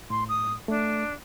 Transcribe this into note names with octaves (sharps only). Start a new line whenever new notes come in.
A2 C6
D#6
A3 D4